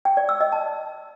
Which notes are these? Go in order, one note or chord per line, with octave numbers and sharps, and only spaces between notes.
G5
D5
E6
D#5
A5